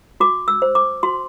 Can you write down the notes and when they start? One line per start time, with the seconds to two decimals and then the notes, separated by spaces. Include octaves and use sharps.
0.20 F#4 D6
0.48 E6
0.62 C5
0.75 D6
1.03 F#4 C6